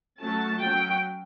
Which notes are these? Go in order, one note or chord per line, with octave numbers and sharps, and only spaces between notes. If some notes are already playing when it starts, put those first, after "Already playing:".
F#3 A3 C#4 A5
F#3 C#4 G5